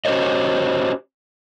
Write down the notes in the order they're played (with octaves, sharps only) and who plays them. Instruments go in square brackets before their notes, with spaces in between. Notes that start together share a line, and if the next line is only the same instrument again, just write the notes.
[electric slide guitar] C#4 F#4 G4 C5 C#5 D#5